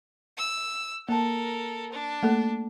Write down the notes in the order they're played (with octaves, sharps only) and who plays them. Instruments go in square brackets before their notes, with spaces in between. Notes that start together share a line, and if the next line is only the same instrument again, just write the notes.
[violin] E6
[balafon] A#3 A5 [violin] A4 A#4
[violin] D4
[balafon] A3 A#3 A4